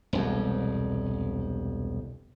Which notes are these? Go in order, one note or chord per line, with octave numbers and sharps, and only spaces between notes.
E1 C2 F2